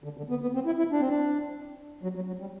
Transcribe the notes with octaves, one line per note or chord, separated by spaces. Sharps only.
D3
D3
B3
B3
C4
E4
E4
D4
C4
D4
F#3
F#3
F#3
G3